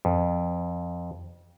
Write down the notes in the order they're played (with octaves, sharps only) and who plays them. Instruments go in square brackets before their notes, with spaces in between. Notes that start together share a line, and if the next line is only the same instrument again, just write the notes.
[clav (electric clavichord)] F2